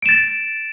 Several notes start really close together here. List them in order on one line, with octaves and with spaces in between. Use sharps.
D7 E7 A6